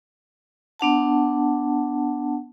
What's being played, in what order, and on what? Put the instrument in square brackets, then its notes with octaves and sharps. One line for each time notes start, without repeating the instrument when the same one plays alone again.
[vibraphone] B3 D4 F#5 A5